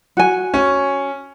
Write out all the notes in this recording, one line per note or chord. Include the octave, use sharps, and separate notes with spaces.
F#4 G#5
C#4